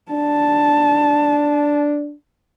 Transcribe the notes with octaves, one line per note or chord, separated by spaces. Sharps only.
D4 A5